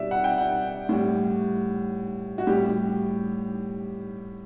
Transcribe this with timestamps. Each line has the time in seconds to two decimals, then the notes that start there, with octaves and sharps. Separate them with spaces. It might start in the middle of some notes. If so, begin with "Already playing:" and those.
Already playing: B2 G3 D5 E5
0.11 F#5
0.24 G5
0.38 F#5
0.89 A2 G3
2.38 F#4
2.47 A2 G3 G4